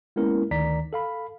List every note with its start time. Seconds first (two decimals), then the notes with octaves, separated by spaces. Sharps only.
0.16 G#3 A#3 B3 C#4 E4 A#4
0.51 D2 D#3 D5 A#5 B6
0.93 A4 F5 B5